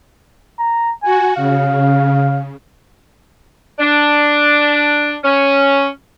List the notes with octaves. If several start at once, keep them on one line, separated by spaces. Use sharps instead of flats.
A#5
F#4 G#5
C#3 F5
D4
C#4